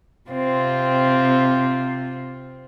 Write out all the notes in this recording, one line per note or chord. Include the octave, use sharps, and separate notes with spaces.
C3 C4 F4